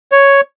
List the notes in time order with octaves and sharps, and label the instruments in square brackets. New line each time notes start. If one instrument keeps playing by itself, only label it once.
[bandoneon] C#5